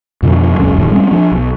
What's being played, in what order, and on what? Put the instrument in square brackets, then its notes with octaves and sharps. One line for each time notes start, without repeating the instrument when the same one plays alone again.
[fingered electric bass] F2 B2 D3 F3
D#1 C2 F2 C#4
E1 G2 A#2 D#3
G3 G#3 C4 C#4
F3 D4
B1